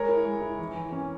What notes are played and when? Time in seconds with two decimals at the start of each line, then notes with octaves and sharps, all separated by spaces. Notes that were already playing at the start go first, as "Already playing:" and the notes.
Already playing: G#3 A#4 C#5
0.09 E4
0.25 G#3
0.42 E4
0.59 E3
0.76 E3
0.92 C#4